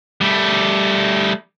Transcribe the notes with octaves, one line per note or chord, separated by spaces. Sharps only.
G3 A3